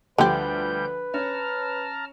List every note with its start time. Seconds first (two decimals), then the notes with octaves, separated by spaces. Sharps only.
0.18 D2 D3 F3 G3 G4 B4 G5 G6
1.14 C#4 A5 A#5 F6